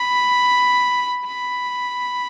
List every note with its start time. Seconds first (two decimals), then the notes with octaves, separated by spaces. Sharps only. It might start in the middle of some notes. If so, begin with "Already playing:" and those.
Already playing: B5
1.25 B5